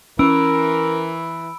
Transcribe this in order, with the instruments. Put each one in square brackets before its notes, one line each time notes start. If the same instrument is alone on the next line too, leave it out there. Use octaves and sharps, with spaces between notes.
[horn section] E3 [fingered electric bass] C#4 [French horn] A#4 [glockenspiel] B5 E6 D7